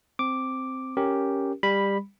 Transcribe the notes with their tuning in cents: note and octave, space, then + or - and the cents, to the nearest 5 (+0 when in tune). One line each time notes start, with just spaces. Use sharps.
C4 +0 D6 +0
C#4 +0 G4 +0 A#4 +0
G3 +20 B5 -5